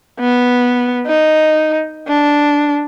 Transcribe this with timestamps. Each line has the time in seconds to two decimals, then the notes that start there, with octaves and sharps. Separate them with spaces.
0.20 B3
1.07 D#4
2.08 D4